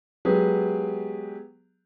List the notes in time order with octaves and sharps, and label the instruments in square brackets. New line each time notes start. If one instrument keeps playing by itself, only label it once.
[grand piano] F#3 G#3 B3 G4 G#4